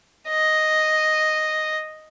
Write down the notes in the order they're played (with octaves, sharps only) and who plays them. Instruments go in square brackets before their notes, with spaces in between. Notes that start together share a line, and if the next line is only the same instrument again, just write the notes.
[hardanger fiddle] D#5